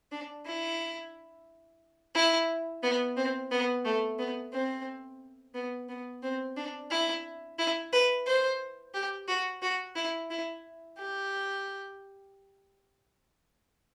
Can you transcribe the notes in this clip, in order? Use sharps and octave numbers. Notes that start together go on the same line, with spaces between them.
D4
E4
E4
B3
C4
B3
A3
B3
C4
B3
B3
C4
D4
E4
E4
B4
C5
G4
F#4
F#4
E4
E4
G4